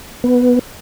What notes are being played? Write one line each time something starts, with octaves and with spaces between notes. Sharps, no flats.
B3